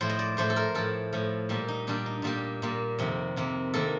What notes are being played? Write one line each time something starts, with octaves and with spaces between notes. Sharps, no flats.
A2 F3 A3 C5
D#5
D5
A2 F3 A3 C5
A4
A#4
A2 F3 A3 A4
A2 F3 A3
A#2 G3 A#3
D#4
A#2 G3 A#3 D4
D#4
A#2 G3 A#3 G4
A#2 G3 A#3
F2 C3 D#3 A#3
F2 C3 D#3 A#3
C3 D#3 A#3 A4